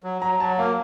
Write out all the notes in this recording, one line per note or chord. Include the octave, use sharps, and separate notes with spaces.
F#3
F#3 A#5
F#3 A5
A#3 F5